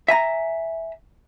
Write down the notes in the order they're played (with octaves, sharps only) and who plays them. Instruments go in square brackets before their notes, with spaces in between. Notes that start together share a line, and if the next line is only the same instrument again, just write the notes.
[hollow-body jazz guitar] E5 G#5 A#5